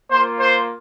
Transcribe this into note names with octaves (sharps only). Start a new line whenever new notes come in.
A#3 F4 C5
C5